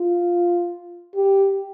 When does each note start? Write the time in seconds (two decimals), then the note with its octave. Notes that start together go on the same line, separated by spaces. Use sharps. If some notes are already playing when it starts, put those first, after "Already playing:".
Already playing: F4
1.16 G4